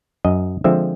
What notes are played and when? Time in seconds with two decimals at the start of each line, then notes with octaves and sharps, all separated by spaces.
0.25 F#2 D#5
0.64 D3 F3 G#3 C4 E5